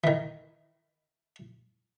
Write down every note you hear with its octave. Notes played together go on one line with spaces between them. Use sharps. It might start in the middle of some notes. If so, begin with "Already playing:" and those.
D#3 E3